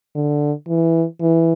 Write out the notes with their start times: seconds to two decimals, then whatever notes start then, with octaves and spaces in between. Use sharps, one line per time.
0.15 D3
0.68 E3
1.21 E3